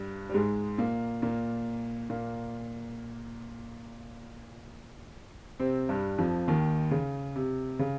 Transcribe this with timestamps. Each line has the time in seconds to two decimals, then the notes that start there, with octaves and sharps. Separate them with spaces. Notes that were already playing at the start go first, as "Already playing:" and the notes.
Already playing: G2 G3
0.29 G3
0.34 G#2 G#3
0.78 A#2 A#3
1.22 A#2 A#3
2.10 A#2 A#3
5.59 C3 C4
5.89 G2 G3
6.18 F2 F3
6.48 D#2 D#3
6.91 C#3
7.36 C3
7.79 C#3